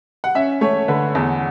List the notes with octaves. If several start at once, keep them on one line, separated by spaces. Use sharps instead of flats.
F#5
C#4 E5
A3 C#5
D3 B4
E2